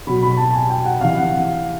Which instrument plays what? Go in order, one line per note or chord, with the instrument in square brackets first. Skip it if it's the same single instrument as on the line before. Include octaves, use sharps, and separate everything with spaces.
[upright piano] B2 F#3 B5
B5
A5
G#5
G5
F#5
C3 E3 F5
F#5